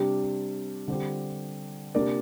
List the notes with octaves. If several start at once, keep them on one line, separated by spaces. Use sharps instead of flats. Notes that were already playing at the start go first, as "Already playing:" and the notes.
Already playing: C3 G3 D4 G4
D3 G3 C4 G4
C3 A#3 D4 A#4 D5